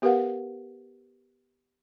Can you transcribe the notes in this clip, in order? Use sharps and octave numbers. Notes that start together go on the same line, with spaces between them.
B3 G4 A#4 B4 F5 F#5